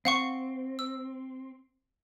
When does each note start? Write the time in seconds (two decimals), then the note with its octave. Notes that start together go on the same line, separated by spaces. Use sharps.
0.05 C4 F5 F#5 C#6
0.79 E6